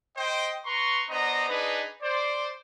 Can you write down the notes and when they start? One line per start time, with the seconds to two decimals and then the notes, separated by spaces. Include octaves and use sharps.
0.17 C5 D#5 G5
0.66 B4 A#5 C6 C#6
1.09 B3 D4 C5 D#5 A#5
1.49 D4 D#4 G#4 B4
2.02 C5 D5